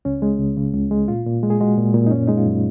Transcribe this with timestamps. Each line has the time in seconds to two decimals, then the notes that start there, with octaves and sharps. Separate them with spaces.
0.05 C#2 C#4
0.22 G#3
0.40 C#2
0.57 C#3
0.74 C#2
0.91 G#3
1.08 A#2 F4
1.26 A#2
1.43 G#3
1.50 G#4
1.60 G#3 F#4
1.78 A#2
1.94 A#2
2.07 D#4
2.11 F#2 C#4
2.28 G#3 D#4
2.38 F4
2.46 F#2